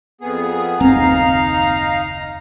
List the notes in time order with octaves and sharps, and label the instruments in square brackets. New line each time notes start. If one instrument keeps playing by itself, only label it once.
[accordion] F2 B3 G#4
[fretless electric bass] F#1 D#2 C4 [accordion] D#4 F5 A#5